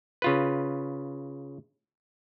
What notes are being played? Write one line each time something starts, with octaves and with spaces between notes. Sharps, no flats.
C#3 F4 B4